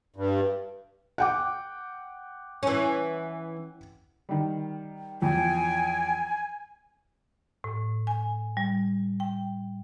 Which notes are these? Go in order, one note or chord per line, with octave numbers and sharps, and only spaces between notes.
G2
F#5 G5 D6
E3 C#4
D#3 G3
E2 F3 G5 G#5
A2
G#5
G3
G5